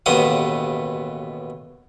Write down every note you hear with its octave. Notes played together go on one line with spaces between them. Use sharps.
A1 D#2 B2 B3 F4 D#6